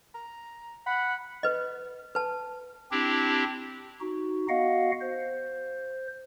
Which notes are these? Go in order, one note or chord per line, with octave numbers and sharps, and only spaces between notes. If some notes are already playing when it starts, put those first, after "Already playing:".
A#5
F#5 B5
B4 D#5
B4 A5
C4 D4 E4 G4
D#4 F#4
B3 F#4 D#5 F5 F#5
C5